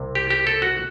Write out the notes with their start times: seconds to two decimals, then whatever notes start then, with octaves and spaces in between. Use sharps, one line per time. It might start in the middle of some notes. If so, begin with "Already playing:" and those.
Already playing: C2 C3
0.15 G4
0.30 G4
0.47 A4
0.62 F#4